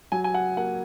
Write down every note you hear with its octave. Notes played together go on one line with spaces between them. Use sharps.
F#3 G#5
G#5
F#5
A#3 F#5